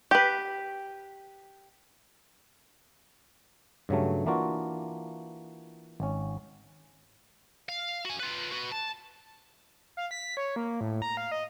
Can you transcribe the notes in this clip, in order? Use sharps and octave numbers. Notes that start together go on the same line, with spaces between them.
G4 B4
G2 C#3 F#3 A3
E3 A#3 D4 F4 F#4
G#1 C#4
F5
F#4 G#5
F4 B4
F#4 B4
A5
F5
B6
C#5
A#3
A2
A#5
F5
D#5